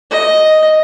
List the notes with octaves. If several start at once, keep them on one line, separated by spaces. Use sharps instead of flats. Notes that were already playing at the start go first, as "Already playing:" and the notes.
D#5